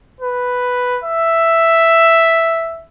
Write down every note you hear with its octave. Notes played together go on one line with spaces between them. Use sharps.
B4
E5